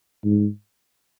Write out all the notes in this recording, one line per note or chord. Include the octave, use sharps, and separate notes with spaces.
G#2